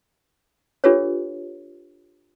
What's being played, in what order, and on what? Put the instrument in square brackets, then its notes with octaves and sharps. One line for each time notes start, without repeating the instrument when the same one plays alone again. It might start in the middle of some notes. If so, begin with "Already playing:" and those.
[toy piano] D4 F4 G4 A4 B4 C#5